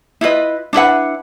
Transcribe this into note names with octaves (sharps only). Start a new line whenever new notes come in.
E4 F4 B4 D#5
D4 E4 B4 F#5